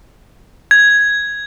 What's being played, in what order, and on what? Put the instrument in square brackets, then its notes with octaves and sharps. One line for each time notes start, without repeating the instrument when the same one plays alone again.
[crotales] G#6